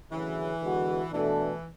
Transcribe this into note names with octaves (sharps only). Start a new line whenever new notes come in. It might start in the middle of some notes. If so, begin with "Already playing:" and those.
D2 C#3 E3 F#3 C#4 G#4
D3 G#3 B3 F#4
B2 E3 A3 D4 A4